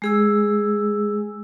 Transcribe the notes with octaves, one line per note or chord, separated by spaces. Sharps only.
G#3 G#4 E6